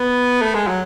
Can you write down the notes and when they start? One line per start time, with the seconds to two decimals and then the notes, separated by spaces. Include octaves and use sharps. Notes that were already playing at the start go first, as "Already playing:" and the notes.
Already playing: B3
0.41 A3
0.55 G#3
0.67 F#3